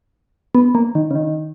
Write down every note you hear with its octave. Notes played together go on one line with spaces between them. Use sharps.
B3
A#3
D#3
C#3
D#3